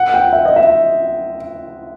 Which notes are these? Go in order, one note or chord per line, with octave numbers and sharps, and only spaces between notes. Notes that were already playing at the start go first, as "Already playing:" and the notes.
Already playing: F#5
G5
E5
D#5
E5